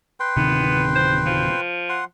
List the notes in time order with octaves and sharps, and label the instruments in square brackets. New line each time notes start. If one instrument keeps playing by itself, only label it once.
[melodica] B4 G5 C6
[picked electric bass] D1 C3 D#3 [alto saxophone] B3
[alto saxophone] C5
F3
[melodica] F#5 C6